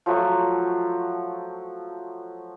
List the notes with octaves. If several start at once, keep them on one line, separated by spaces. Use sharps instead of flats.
F3 F#3 A3 F#4